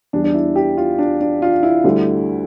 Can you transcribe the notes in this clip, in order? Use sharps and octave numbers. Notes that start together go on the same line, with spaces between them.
E2 E3 G3 D4
D4
E4
G4
F4
D4
D4
F4
E4
D2 D3 G3